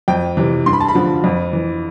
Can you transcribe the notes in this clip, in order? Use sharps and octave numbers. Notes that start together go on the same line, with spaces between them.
F2 G5
C3 E3
G2 C6
B5
A5
B5
D3 F3
F2
E3